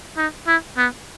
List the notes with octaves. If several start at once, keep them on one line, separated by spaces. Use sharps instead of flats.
D#4
E4
B3